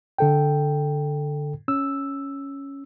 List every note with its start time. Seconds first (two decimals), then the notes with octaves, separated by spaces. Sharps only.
0.18 D3 A4 G5
1.68 C#4 E6